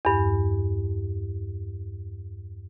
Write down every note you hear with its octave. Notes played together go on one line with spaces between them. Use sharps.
E2 G2